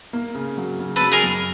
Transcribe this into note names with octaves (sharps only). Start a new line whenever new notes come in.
A#3
C#3
F#3
C#3
F#3 A4 B4
G#4 A#4
F#2